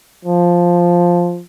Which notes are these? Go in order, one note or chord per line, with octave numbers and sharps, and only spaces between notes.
F3